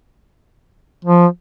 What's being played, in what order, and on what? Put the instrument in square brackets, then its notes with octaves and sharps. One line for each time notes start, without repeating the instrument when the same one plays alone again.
[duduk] F3